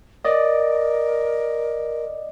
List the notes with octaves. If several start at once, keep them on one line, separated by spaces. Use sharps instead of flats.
A#4 D5 D#5